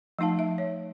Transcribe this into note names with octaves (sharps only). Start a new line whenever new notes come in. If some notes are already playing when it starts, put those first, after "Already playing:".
F3 A3 D#4 F5 A5
E5
C#5